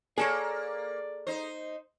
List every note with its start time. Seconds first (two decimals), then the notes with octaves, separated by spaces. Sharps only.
0.18 A#3 G#4 A4 C#5 D5
1.27 D#4 C5